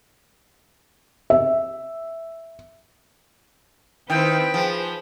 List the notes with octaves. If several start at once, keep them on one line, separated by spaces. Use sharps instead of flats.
E5
D#3 C4 E4 B4 G5
F3 G#4 C5